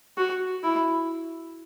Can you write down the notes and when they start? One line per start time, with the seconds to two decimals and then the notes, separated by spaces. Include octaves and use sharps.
0.17 F#4
0.63 E4